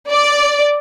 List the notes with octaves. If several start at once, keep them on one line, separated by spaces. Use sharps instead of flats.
D5